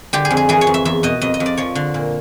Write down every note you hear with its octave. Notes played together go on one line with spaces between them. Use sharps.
D3 G4
G#4
F2
G#4
E3 G#4
C#5
F2
E5
E2 E5
B2 D#5
F2 D#5
D#5
F2
D5
F3 C#5
D3
A#2